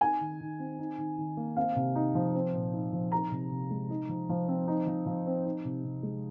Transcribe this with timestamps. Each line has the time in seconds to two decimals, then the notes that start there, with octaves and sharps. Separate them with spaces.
0.01 D#4 G#5
0.21 D#3
0.41 D#3
0.60 C4
0.79 D#4
0.98 D#3
1.18 D#3
1.37 A#3
1.56 C4 F5
1.76 C3
1.95 D#4
2.15 F3
2.35 C4
2.54 A#2
2.74 D#4
2.93 F3
3.12 D#4 A#5
3.31 C3
3.51 C3
3.71 G#3
3.90 D#4
4.09 F3
4.29 F3
4.48 C4
4.68 D#4
4.87 F3
5.06 F3
5.27 C4
5.46 D#4
5.65 C3
5.84 C3
6.03 G#3